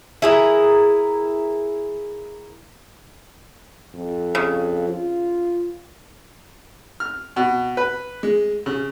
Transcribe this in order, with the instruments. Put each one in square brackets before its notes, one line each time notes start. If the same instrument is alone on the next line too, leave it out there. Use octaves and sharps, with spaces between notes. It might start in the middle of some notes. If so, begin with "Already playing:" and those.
[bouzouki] E4 G#4 A#4
[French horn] F2
[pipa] C#3
[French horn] F4
[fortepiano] F6
B2
B4
G#3
C#3